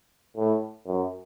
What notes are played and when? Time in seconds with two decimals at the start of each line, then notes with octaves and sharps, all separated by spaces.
0.37 A2
0.86 F#2